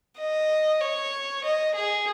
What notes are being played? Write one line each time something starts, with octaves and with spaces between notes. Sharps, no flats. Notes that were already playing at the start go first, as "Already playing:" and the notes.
D#5
C#5
D#5
G#4